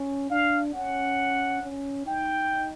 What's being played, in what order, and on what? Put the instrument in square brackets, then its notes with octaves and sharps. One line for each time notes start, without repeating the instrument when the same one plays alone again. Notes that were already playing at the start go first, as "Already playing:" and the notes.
Already playing: [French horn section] C#4
[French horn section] D4 [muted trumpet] F5
[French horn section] C#4 [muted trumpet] F#5
[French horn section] C#4
[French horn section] D#4 [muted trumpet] G5